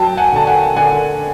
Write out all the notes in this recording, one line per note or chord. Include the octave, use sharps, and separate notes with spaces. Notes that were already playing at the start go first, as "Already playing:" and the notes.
Already playing: F#3 G5 A5
F#5 G#5
D3 A5
F#5 G#5
D3 F#5 G#5